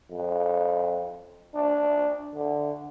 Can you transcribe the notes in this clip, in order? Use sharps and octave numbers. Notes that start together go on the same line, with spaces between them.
F2
D4
D3